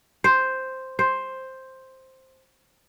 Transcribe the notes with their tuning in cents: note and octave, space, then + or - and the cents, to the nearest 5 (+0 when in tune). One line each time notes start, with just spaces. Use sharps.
C5 +0
C5 +5